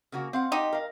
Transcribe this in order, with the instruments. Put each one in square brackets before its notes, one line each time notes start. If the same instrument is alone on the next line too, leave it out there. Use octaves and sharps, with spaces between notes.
[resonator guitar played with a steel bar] C#3 A#3 F#4
C4 F5 F#5
[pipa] D#4 G4
[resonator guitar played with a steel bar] A#4 F5